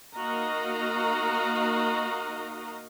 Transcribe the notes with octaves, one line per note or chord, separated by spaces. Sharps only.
A#3 D#4 F#4 D#5 F5 A#5